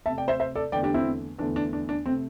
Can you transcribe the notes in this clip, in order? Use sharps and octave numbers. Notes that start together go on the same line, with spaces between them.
C3 A3 E5 A5
D5 G5
C5 E5
C5 E5
A4 D5
E2 D3 A3 D5 G5
D4 G4
C4 E4
E2 D3 A3 D4
D4
D4
D4
C3 A3 C4